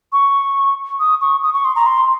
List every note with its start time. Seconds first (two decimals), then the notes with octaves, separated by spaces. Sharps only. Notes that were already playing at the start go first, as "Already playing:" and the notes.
0.13 C#6
1.00 D#6
1.21 C#6
1.42 D#6
1.54 C#6
1.65 C6
1.76 A#5
1.86 C6